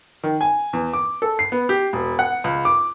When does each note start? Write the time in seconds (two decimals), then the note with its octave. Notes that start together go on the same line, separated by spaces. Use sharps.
0.24 D#3
0.41 G#5
0.73 E2
0.93 D6
1.22 A4
1.39 C7
1.52 B3
1.69 G4
1.93 E1
2.19 F#5
2.44 C#2
2.65 D6